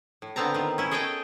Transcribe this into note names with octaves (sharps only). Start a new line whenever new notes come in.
A2
D3 B3 C4 A5 A#5
D#3 F4
C#4 E4
G#4 A4 C#5 D#5 G5